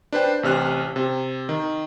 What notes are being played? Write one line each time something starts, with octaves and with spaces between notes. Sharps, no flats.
D4 B4 C5 G5
A1 C3 F6 F#6
C3
D#3